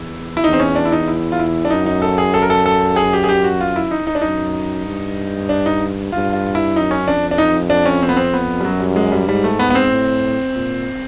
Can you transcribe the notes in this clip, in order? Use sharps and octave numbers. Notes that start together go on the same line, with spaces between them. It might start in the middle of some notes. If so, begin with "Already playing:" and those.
Already playing: E2 E4
E4
E2 D#4
C4
C#4
D4
E4
D#4
E4
F4
E4
D4
F#2 D#4
D#4
A4
G#4
A4
A#4
A4
A4
G#4
G4
G#4
G4
F#4
F4
E4
D#4
D#4
D4
F#2 D#4
G2
D4
D#4
G2 F4
F4
E4
F#2 D#4
C#4
F2 D4
D4
D#4
D4
C#4
C4
B3
C4
B3
G3
F#2 F#3
G3
G#3
G3
G#2 G3
A3
B3
B3
C4
A2
A#2